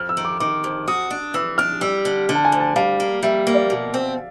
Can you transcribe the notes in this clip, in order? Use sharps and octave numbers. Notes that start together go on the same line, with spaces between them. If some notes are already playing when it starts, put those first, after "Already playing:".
Already playing: F2 F6
E6
D#3
D6
D#3 D6
F2
F#4 D#6
D4
E3 E6
D4 F6
G3 E6
D3
D3
A5
G#5
D2
A5
G3 F5
A#3
G3 E5
A#3
D5
B2
C4